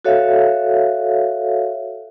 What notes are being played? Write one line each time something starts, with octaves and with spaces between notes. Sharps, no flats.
F#4 A4 C#5 E5 F5